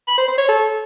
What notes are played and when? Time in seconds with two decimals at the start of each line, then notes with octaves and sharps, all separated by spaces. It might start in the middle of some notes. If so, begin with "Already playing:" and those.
0.08 B5
0.18 C5
0.28 C5
0.38 C#5
0.48 A4